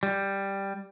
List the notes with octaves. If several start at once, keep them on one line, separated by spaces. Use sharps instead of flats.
G3